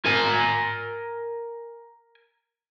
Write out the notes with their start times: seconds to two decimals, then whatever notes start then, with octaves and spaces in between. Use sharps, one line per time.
0.06 A#4 G#5